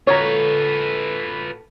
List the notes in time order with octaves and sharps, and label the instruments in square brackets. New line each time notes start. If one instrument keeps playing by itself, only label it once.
[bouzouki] A2 F#4 [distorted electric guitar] F4 B4 [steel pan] C#5 A#5